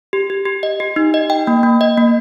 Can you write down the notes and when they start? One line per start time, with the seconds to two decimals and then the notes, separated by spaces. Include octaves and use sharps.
0.13 G4
0.30 G4
0.45 G4
0.63 D#5
0.80 G4
0.96 D#4
1.14 D#5
1.30 G5
1.47 A#3
1.63 A#3
1.81 D#5
1.98 A#3